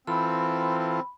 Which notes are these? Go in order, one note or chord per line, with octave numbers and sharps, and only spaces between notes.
E3 C4 F4 A4 B5